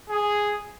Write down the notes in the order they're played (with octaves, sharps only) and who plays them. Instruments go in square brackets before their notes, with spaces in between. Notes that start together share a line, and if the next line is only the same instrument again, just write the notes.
[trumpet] G#4